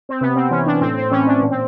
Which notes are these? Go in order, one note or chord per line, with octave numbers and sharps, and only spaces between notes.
C4
C3 B3
C4
E3 C#4
D4
A2 C4
C4
E3 C#4
D4
A#2
C4